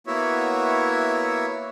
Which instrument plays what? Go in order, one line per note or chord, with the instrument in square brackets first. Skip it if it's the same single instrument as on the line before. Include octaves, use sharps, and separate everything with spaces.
[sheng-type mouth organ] A#3 B3 E4 F#4 C#5 E5